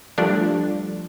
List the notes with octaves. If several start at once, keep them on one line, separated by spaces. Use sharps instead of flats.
F3 G3 A3 D4